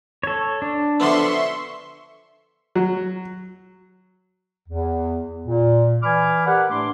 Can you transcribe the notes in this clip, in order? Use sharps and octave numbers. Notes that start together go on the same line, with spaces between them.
A4 C#5
D4
D3 F3 B3 E5 C6 C#6
F#3
E2
A#2
E3 D5 G#5 B5 D6 F6
G4 A#4 B4 D5 F#5
A2 A3 D4 B4 C6 D6